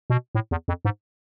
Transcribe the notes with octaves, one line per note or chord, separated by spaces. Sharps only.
B2
A2
E2
F2
G#2